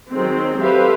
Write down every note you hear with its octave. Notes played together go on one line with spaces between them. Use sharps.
D#3 F#3 G#3 C4
G4 A4 B4 C5 E5 F5